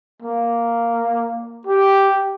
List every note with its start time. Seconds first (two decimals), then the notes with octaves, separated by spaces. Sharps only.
0.22 A#3
1.67 G4